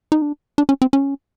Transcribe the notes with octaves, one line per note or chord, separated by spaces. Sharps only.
D#4
D4
D4
C#4
C4
C#4